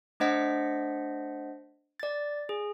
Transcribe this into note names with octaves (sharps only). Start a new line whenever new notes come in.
A3 D4 C5 D#5 F#5 B6
D5 A6
G#4